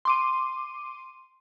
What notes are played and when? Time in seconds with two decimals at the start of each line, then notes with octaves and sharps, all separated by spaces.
0.05 C6 D6 D#7